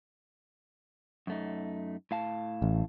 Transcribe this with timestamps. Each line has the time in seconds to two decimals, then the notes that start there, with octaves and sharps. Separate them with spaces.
1.27 F#2 A3 D#4
2.11 A2 F5 A5
2.62 A1